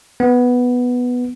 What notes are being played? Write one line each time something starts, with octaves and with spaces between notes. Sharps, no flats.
B3